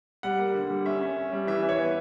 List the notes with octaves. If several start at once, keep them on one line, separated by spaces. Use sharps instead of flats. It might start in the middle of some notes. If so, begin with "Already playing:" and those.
G3 F#5
A#3
D3
G3
C#4 E5
C#4
C#4
G3
E3 E5
E3
C#5
B3